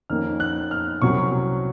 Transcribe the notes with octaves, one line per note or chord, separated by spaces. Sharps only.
F2 D#3 A#3 C#4 F6
F#6
F6
C2 C3 F#3 C#4 C#6